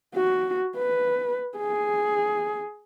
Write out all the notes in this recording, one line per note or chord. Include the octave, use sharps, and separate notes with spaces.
F#4
B4
G#4